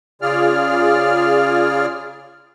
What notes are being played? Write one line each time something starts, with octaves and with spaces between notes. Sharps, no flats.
C#3 F4 G#4 D5 F6